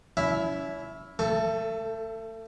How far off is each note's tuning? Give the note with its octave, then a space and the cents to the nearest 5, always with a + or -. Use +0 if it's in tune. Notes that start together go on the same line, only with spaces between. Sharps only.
C#4 +35 E4 +0 E5 +0
A3 +30 A4 +0 C#6 +0